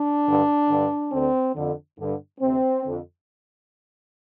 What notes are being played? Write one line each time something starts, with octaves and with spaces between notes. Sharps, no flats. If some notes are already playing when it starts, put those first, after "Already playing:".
Already playing: D4
G2 D3
G2 D3
D2 D3 C4
F2 D3
G2 D3
D2 C3 C4
F2 D3